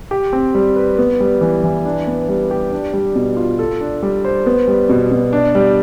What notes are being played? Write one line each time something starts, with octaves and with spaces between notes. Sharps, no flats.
G4
C4
G3
B4
B3
G3
E3
E3
D4
B3
G3
G4
D4
G3
B2
F4
A4
D4
G3
C5
B3
G3
B2
B2
D4
G3